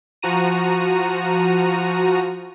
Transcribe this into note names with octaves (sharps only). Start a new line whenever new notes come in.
F3 F#4 A#5 D#7